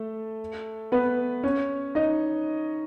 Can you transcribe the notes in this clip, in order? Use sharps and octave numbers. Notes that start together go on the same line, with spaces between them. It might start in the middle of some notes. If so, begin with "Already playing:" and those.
Already playing: A3 A4
B3 B4
C#4 C#5
D#4 D#5